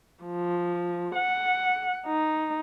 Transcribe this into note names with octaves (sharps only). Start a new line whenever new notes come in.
F3
F#5
D#4